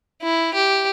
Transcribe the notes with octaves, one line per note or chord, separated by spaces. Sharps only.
E4
G4